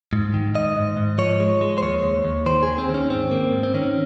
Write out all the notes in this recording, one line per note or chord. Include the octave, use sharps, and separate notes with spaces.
G#2
D#3
G#2 D#5
G#2
G#2
F3 C#5
G#3
G#3
C5
D#2 C#5
D#2
D#2
D#3 C5
G#4
D#3
C4
D#2
C#4
G#2 C4
A#3
G#2
C4
D#3 C#4